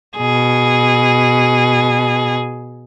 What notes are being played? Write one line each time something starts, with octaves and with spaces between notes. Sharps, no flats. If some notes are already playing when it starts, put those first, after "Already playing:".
B2 G#4